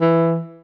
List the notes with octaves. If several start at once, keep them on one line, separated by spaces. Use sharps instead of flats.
E3